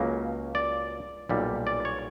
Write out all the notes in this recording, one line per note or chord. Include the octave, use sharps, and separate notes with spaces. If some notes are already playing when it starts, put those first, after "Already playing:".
Already playing: C#2 C#3 F#3 A#3
D5
B1 A#2 G3
D5
C#5